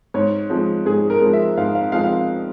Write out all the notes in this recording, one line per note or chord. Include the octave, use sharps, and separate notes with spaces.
G#2 C#5
F3 G#3
G#2 G#4
A#4
F3 G#3
E5
G#2 F5
F5
F3 G#3 F5
F5